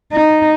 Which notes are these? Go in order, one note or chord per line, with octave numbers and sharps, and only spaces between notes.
D#4